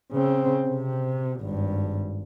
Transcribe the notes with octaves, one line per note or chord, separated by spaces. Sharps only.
C#3 C4
C3
G#1 G2